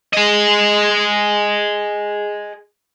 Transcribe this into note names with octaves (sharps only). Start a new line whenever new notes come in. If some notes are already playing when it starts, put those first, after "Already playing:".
G#4 D#5